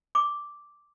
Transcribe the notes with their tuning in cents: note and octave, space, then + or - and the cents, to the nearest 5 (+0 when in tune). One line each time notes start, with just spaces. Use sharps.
D6 -5